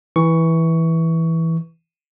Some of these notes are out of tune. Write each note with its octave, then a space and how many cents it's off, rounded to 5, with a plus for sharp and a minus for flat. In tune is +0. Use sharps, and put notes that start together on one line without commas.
E3 -10 C#6 +15